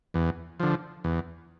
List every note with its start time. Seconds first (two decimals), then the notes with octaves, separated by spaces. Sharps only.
0.14 E2
0.60 D3 F3
1.04 E2